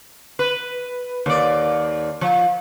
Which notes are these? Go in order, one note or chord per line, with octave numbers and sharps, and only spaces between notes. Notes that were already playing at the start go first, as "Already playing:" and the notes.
B4
D#2 D5
F3